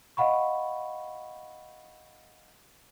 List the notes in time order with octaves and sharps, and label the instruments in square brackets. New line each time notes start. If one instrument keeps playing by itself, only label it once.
[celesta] D#5 F5 F#5 B5 C#6